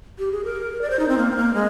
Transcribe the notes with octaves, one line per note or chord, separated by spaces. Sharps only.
G4
G#4
A#4
D5
C5
D#4
C4
A#3
C4
A#3
G#3